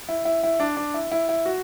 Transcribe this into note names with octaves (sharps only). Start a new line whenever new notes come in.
E4
E4
E4
D4
D4
E4
E4
E4
F#4